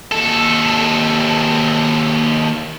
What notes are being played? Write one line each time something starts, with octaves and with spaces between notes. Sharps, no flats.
D#2 A4